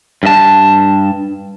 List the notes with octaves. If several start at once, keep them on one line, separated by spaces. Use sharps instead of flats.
G2 A5